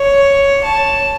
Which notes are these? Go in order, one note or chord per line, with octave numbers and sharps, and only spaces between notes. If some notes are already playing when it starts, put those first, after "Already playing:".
Already playing: C#5
A5